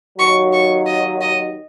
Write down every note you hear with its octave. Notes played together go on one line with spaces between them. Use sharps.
D#2 D#3 F#3 C#6
C#6
D#5
D#5